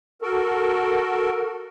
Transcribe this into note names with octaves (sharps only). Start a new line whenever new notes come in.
F#4 A4 A#4